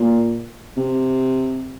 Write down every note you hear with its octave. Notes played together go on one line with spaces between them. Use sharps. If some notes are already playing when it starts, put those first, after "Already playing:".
Already playing: A#2
C3